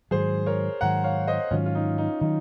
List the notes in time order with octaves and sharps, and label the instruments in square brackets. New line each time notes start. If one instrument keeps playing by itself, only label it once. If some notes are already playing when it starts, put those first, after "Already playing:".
[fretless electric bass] G#2 D#3 F#3 [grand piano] G#4 C5
[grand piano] A#4 C#5
[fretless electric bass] G#2 D#3 F#3 [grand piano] F#5 A#5
[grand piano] C#5 F5
C5 D#5
[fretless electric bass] G#2 D#3 F#3 [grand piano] C#4 F4
[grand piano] F4
D#4
D#4
[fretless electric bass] D#3 F#3 [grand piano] D#4